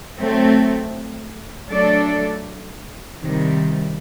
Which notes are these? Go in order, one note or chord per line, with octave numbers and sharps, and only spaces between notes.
F#3 A3 C4
F#3 A3 D4 A4 D5
C3 D#3 G3